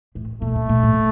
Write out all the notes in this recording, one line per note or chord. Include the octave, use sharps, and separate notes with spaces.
A2
A#2 A3
C#3
A#2
A2